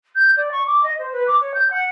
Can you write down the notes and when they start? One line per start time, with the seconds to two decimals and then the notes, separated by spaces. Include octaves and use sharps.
0.15 G6
0.36 D5
0.51 C#6
0.66 D6
0.83 D#5
0.98 C5
1.12 B4
1.27 D6
1.40 C#5
1.54 G6
1.70 F#5